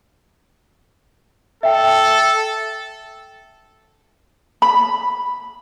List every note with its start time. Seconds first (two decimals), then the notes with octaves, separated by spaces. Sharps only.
1.63 A4 E5 G5
4.62 B5